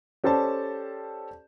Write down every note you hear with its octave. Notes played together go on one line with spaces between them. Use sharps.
C#4 G4 A4 C5 D5 A5